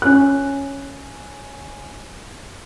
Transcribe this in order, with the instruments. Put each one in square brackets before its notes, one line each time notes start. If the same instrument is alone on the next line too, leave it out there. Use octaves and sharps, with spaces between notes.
[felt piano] C#4 F#6